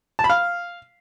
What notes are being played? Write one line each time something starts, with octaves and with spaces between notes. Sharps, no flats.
A5
B5
F5